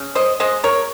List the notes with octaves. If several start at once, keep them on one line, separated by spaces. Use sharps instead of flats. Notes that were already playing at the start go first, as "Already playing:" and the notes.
Already playing: C#3
C5 D#5
G#3 C5 D#5
A#4 C#5